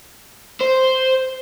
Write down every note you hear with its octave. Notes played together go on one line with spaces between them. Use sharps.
C5